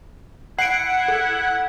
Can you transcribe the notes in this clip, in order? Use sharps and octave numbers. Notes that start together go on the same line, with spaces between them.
E4 F#5 C7 D7
A4